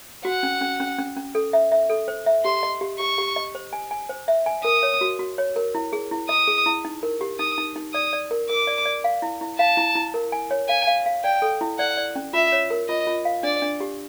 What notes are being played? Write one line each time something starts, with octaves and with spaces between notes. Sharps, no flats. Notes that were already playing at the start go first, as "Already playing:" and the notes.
F#4 F#5
C#4
C#4
C#4
C#4
C#4
A4
E5
E5
A4
C5
E5
G4 C6
D#5
G4
G4 C#6
G4
D#5
C5
G#5
G#5
C5
E5
G#5
A#4 D#6
C#5
F#4
F#4
C#5
A#4
E4
G#4
E4
D#5 D#6
G#4
E4
D#4
A#4
G4
D#4 D#6
D#4
D#4
D5 D#6
D5
A#4
A#4 D6
D5
D5
F5
E4
E4
F5 A5
E4
E4
A#4
G#5
C#5
F5 G#5
F5
F5
D5 G5
A4
E4
D5 F#5
D5
C#4
F4 E5
C#5
A#4
F4 D#5
F4
F5
D4 D5
D4
G4